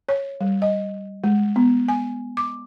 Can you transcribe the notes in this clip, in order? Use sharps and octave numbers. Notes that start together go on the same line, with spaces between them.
C#5
G3
D#5
G#3
B3
G#5
D6